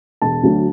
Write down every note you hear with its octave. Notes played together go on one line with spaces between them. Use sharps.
E1 A5
D2 D3 F#3